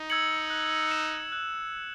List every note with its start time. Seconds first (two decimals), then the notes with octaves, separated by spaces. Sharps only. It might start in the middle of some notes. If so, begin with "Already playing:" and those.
Already playing: D#4
0.10 E6 G#6 C#7 F#7
0.50 F#6
0.91 C#7 E7
1.32 F#6